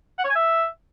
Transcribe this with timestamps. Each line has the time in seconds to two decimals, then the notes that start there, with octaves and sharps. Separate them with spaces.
0.19 F#5
0.24 C#5
0.30 G#5
0.36 E5